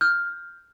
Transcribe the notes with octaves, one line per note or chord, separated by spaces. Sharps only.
F6 G6